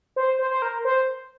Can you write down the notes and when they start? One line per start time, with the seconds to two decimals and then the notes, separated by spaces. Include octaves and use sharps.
0.16 C5
0.39 C5
0.51 C5
0.62 A#4
0.85 C5